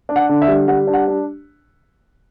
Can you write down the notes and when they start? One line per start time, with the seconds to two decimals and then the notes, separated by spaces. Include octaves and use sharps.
0.09 D4
0.16 F#5
0.29 D3
0.42 E5
0.48 G3
0.68 G3 F#5
0.87 D4
0.93 F#5
1.08 D4